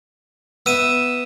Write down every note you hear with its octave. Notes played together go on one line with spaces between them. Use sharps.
B3 E5 E6 D#7 E7